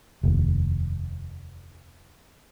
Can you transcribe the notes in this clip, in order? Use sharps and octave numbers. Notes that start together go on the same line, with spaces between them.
F1 D#2